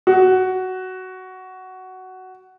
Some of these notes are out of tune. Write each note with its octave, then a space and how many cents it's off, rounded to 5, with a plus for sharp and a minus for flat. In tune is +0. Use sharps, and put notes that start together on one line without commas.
F#4 +10